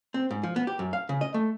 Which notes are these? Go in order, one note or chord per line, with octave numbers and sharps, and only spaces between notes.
C4
G#2
F3
B3
G4
F#2
F5
C#3
D#5
A3